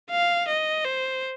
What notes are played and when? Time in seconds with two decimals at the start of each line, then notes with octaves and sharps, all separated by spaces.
0.11 F5
0.48 D#5
0.85 C5